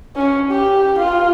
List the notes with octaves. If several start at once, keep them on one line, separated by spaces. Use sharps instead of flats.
C#4
G4
F4